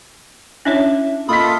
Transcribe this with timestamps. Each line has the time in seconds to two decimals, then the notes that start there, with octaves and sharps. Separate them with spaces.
0.65 C#4 D4 E4 C#5 E5
1.29 A#3 F4 A4 D#5 B5 D#6 B6